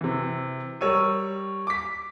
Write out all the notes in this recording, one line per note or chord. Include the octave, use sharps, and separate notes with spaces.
C3 E3
G3 A#4 C#5 E6 D#7
D6 B6